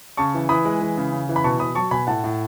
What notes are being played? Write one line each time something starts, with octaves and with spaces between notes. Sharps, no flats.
C#3 A5 C#6
E3
E3 B5 D#6
G#3
E3
C#3
C#3
E3
B5
B2 A5 C#6
B2 B5 D#6
F#3 A5 C#6
B2 G#5 B5
A2 F#5 A5
A2